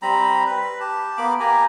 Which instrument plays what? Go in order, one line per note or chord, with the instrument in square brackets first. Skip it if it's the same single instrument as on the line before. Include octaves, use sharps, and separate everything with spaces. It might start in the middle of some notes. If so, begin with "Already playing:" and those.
[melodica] G3 C4 A#5 B5
B4
G4 A5
A#3 B3 B5 D6
A#3 G4 G#5 A#5